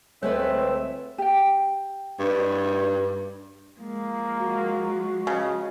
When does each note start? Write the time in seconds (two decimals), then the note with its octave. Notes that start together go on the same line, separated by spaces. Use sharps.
0.23 C#2 D3 G#3 A3 C4 B4 C#5 E5
1.18 G4 G5
2.19 G2
3.79 F3 G#3 A#3
4.39 F#4
5.27 C#3 D#5